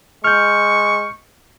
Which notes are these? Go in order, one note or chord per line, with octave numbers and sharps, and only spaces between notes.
G#3 C#6 F6 G6